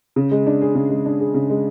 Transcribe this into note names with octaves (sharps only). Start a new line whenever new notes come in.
C#3
G#3
D4
G#4
C#3
G#3
D4
G#4
C#3
G#3